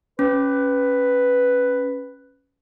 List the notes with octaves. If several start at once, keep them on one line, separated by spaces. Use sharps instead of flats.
C#4 B4